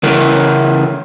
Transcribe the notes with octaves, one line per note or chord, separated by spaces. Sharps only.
C#3 E3 A#4